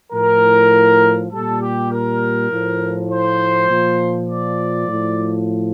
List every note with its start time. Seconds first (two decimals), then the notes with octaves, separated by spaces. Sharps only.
0.12 A2 F3 A#4
1.31 A#2 G3 A4
1.61 G4
1.91 A#4
2.51 A2 F3
3.09 C5
3.69 A#2 F3
4.28 D5
4.88 A2 F3